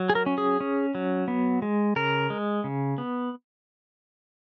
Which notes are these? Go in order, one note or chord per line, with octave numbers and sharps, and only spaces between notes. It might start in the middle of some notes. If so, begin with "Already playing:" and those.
Already playing: F#3
G#4
A#4
C#4
G#4
C#4
F#3
B3
G#3
C#3 A#4
G#3
C#3
B3